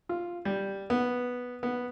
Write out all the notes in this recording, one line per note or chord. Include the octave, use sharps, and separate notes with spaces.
F4
G3
B3
B3